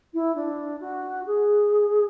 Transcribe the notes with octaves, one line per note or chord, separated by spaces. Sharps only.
E4
D4
F#4
G#4